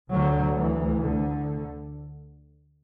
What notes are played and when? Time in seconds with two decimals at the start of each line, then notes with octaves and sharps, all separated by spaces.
0.11 D2 D3 F#3
0.55 E3
0.99 D3